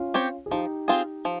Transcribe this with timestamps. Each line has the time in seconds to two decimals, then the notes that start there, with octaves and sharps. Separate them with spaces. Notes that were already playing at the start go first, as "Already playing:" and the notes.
Already playing: C#4 F4
0.14 C4 G4 C#5
0.46 G#4
0.51 F3 D#4 G4
0.88 C4 F4 G#4
1.25 F3